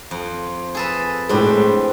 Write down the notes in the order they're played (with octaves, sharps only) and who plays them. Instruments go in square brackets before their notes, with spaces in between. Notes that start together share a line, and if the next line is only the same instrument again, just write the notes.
[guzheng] F2
G#4 A4 B4
[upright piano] A2 G#3 [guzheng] C4 D4 B4